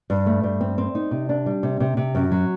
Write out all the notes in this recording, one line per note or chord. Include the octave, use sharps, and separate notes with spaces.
G2
A3
G2
C4
C4
D#4
C3
D4
G3
C3
C3
C3
F#2
F#3